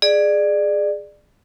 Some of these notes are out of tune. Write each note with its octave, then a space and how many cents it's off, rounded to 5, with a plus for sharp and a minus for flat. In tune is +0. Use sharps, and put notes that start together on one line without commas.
G#4 +0 D5 +20